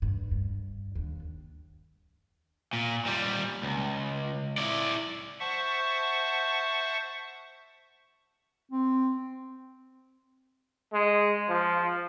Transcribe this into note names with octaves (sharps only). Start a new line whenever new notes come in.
G2
G2
D#2 D4
A#2
A#2 G3
C#2
E4 D5
C5 E5 F#5 A5 C#6
C4
G#3
F3